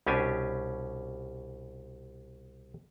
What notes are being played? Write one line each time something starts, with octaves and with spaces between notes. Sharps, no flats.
C2 B2 C#4 D4 G4 G#5